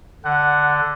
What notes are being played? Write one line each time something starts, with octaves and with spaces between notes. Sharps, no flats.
D3 F#5